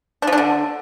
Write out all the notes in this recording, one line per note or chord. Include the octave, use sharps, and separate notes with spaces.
D4
F3
D4
D3